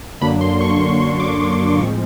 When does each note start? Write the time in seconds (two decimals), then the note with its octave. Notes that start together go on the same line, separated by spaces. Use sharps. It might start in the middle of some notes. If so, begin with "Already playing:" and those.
0.21 F#2 D3 F#3 A#3 D4 B5
0.41 C6
0.61 C#6
0.81 C6
1.00 C6
1.20 D6
1.27 C#6
1.53 C6
1.79 A2 F3 G#3 C4 C#6